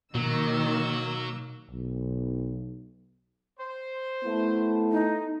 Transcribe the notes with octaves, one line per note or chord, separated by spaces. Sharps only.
B2 D#3 F#3 A#3 E6
B1
C5
A3 B3 E4
D#4